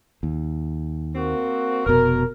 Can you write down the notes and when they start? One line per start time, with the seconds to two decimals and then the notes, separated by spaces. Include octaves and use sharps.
0.23 D#2
1.15 A#3 C4 F#4
1.86 F1 B2 A#4